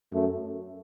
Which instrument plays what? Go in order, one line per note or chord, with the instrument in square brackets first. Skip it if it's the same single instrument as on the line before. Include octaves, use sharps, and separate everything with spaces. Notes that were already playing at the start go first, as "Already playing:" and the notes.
[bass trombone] F#2 [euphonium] A3